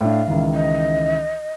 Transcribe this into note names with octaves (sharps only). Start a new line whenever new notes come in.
A2 D4 F5
C#2 D#3 E3
D#5